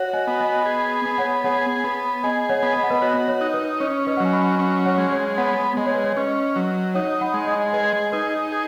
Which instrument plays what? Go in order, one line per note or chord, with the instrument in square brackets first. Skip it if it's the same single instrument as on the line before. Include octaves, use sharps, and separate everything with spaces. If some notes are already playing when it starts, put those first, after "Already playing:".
Already playing: [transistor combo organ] F#4 [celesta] C#5 F#5
[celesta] D#5 G#5
[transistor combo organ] B3
[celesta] D#5 G#5
[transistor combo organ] G#4
B3
[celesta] C#5 F#5
[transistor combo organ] G#4 [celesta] C#5 F#5
[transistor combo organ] B3
[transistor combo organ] G#4 [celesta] D#5 G#5
[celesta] C#5 F#5
[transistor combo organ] B3
[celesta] D#5
F#5
B4 D#5
[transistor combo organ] F#4 [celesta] C#5
[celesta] C#5
[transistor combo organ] D#4
[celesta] B4
[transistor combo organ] C#4 [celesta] C#5
[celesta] B4 D#5
F#5
[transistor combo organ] F#3 [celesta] G#5
[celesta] F#5 B5
[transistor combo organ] C#4
[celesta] C#5 F#5
[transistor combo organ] G#3
[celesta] C#5
[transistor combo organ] B3 [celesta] C#5 F#5
[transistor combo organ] G#3 [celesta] D#5
[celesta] C#5
B4
C#5
[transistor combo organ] C#4 [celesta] B4 D#5
[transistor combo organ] F#3
[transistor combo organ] D#4 [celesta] C#5 F#5
[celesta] F#5 B5
[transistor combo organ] G#3
[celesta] D#5 G#5
[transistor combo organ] G#4 [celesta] B4 D#5
[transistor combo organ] D#4 [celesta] B4
[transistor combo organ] G#4